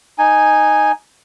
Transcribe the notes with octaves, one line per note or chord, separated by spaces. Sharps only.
D#4 G#5